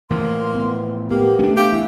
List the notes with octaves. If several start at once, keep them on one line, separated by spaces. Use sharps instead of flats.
A2 E3 F3 A#3 C6
B3
A#3 B3 G4
A3 C#4 D4 G4
G4 F5
E3 E4 F5